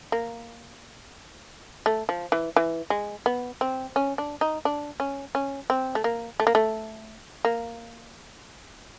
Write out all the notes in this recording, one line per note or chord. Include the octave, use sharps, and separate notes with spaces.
A#3
A3
F3
E3
E3
G#3
B3
C4
C#4
D4
D#4
D4
C#4
C#4
C4
A3
A#3
A3
A#3
A3
A#3